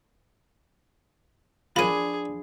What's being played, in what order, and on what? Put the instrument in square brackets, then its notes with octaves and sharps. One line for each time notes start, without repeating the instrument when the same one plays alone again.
[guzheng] F3 D4 [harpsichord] F4 A#4 C#5 [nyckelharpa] G#4 [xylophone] B5 D#7